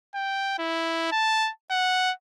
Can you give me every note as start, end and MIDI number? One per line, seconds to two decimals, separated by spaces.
0.15 0.58 79
0.59 1.10 64
1.12 1.50 81
1.71 2.12 78